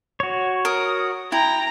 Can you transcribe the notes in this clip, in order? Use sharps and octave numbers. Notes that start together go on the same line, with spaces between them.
F#4 C#5
A#4 D#6
E4 G5 A#5